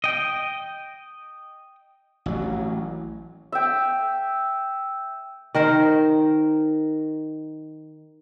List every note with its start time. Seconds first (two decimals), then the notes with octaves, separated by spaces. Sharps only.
0.04 D#5 G5
2.26 A1 F#3
3.52 E5 G5
5.55 D#3 A#4 C5